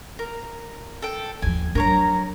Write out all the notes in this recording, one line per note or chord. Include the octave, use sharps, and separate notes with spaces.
A#4
A4 G5
D#2 F3 G#5
F#3 D4 A#4 C#5 A#5